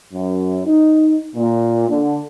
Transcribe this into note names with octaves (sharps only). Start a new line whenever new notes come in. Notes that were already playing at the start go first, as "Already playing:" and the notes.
F#2
D#4
A#2
D3